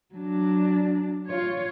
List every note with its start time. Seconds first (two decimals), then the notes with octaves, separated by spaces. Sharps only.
0.15 F#3 D4
1.27 F4 C#5